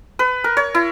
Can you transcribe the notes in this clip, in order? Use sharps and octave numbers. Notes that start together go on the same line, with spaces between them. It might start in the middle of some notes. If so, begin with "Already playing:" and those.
B4
A#4
C#5
E4